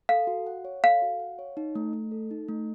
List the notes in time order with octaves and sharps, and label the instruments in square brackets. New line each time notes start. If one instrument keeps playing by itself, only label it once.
[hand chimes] A4 [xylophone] F5
[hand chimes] F#4
F#5
C#5
[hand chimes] A4 [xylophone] F5
[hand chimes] F#4
F#5
C#5
D#4
A3
A3
A4
D#4
A3